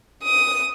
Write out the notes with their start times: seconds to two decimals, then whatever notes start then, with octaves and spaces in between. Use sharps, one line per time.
0.23 D#6